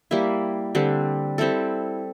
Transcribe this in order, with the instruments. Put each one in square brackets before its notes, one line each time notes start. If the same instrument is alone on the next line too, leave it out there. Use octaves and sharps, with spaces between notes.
[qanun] G3 A#3 E4
D3 G3 C4
G3 C4 E4 A4